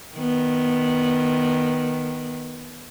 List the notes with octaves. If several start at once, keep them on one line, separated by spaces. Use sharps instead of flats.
D#3 B3